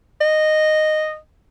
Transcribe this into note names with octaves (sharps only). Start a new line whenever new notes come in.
D#5